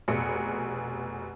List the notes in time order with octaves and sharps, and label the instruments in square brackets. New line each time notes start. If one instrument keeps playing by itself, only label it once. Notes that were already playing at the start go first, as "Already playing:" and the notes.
[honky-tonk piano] F1 B2 G#4 C#7